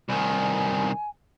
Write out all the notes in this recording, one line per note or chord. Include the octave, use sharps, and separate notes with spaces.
C2 D#3 G#5